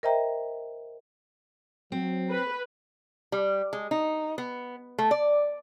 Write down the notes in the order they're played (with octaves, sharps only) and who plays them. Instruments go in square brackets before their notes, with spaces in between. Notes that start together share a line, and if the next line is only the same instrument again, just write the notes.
[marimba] A#4 C5 D#5 E5 G5 A#5
[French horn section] F#3 [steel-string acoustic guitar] C4
[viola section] B4
[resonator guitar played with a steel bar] G3
G#3
D#4
B3
A3
D5